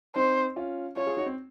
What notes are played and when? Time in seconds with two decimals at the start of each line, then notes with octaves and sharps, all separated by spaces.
0.16 C4 D#4 C5
0.56 C#4 F4
0.96 C#4 F4 C#5
1.06 F4 G#4
1.17 D#4 F#4
1.26 C4